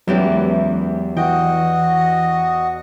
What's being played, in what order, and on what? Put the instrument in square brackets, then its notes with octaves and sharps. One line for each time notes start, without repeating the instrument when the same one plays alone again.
[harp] E2 E3 G4 [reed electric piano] F#3 G#3 C#4
[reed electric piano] E3 [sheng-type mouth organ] F#4 D#5 [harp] G5